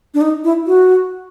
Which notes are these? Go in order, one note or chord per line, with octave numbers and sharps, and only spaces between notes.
D4
D#4
E4
F#4